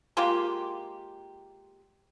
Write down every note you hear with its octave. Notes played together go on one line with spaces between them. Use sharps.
G#3 A#3 F4 G4